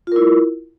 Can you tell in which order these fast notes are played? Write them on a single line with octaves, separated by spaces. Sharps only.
F4 A#4 E4